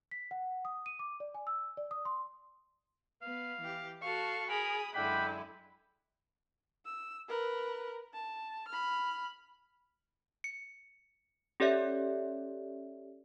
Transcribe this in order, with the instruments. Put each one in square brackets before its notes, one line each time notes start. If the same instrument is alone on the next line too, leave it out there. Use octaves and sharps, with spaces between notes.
[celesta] B6
F#5
D#6
D#7
D6
D5
G#5
E6
D5
D#6
C6
[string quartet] B3 [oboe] F5
[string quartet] E3 G4
[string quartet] F#4 A4 F5 [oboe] C#6
[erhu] G#4 [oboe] A#4 [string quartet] B5 D#6
[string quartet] F#2 D3 G#3 [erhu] E4 [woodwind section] D5 F#5 G5 [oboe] B5
[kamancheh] E6
A#4 B4
A5
B5 F6
[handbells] C#7
C#4 G4 A4 C#5 D5 E5